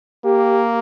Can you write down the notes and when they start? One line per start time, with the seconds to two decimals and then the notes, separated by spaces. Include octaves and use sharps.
0.25 A#3 G4